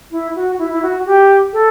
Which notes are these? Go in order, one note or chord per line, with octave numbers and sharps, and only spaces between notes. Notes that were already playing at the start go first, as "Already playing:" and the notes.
E4
F#4
E4
E4
F#4
G4
A4